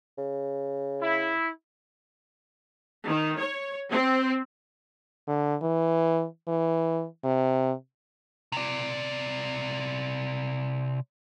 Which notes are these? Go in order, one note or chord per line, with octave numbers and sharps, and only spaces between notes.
C#3
E4
D#3
C#5
C4
D3
E3
E3
C3
C3 D5